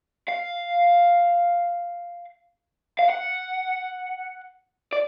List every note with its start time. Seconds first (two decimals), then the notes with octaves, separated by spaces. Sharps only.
0.29 F5
2.99 F5
3.10 F#5
4.93 D5